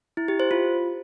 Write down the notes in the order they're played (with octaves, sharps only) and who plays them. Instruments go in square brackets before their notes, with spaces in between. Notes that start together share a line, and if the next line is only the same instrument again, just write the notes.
[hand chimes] E4
G4
C5
F4